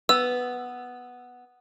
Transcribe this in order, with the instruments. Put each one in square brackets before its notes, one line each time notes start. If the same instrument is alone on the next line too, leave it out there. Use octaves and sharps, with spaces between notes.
[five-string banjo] B3 [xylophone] E6